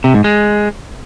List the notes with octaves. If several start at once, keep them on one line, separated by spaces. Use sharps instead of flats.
C3
G#2
G#3